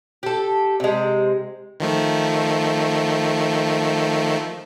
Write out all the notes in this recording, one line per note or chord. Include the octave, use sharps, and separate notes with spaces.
G4 A4
C3 G#3
D#3 F3 A3